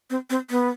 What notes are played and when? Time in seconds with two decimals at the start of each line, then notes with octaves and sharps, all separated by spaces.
0.10 C4
0.30 C4
0.51 B3